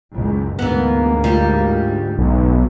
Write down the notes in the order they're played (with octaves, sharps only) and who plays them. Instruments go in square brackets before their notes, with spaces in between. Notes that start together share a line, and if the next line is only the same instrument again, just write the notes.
[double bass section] F#1 C#2
[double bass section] D2 G#2 [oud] E3 B3 [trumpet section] A#3
[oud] G3 F4
[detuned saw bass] B1